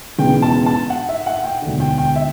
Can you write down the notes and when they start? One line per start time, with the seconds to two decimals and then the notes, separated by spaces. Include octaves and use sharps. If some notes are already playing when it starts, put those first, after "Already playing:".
0.18 E1 E2 C#3 E3 B3 G5
0.42 A5
0.66 A5
0.90 F#5
1.09 E5
1.26 F#5
1.44 G5
1.62 E1 D2 D3
1.80 G5
1.98 G5
2.16 E5